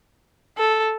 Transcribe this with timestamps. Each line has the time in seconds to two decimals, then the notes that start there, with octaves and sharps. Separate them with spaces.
0.57 A4